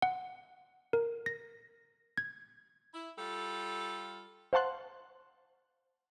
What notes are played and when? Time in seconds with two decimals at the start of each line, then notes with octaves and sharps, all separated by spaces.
0.02 F#5
0.93 A#4
1.26 A#6
2.17 G#6
2.94 E4
3.19 G3 F4 A4
4.53 C5 F5 F#5 A5 C6 F#6